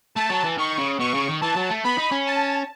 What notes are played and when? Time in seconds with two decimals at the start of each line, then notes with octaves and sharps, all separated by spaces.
0.15 A3 A5
0.30 F#3
0.44 E3
0.58 D#3 C#6
0.78 C#3
1.00 B2 C#6
1.14 C#3
1.28 D#3
1.41 E3 A5
1.56 F#3
1.70 A3
1.84 B3 B5
1.98 D#4
2.12 C#4
2.26 A5